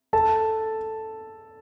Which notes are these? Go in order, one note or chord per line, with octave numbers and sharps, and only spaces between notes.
A4 A5